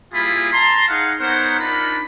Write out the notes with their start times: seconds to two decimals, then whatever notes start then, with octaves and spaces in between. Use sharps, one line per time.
0.14 G3 A#3 E4 F4 G#4 B5
0.53 A5 A#5 C6
0.88 D#4 G#4 F5 F#5
1.20 B3 D#4 A#4 C5 C#5 F#5
1.60 D4 D#4 F4 A#4 B5